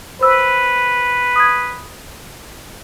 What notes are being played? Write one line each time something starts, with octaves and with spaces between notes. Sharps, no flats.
B4 C5 E6
D#6 G#6